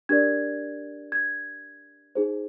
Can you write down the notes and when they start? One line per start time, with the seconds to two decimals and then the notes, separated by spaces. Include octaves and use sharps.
0.09 D4 G4 A#4 D5 G#6
1.12 G#6
2.15 D#4 G#4 C5